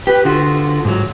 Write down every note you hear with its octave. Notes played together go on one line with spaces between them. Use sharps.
G4 B4
D3 F4 F#4
G#2 F#3